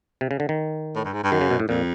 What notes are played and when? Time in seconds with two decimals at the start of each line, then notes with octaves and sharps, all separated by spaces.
0.21 C3
0.31 C#3
0.40 D3
0.49 D#3
0.96 A2
1.05 G2
1.13 G#2
1.24 G2
1.32 F#2 D#3
1.41 C#3
1.51 B2
1.60 A2
1.69 F2 A#2